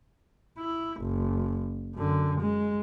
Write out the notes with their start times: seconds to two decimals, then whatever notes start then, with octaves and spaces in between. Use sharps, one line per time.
0.59 E4
1.01 F#1
1.95 F#2 D3
2.41 G#3